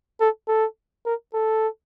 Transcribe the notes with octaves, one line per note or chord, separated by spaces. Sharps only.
A4
A4
A#4
A4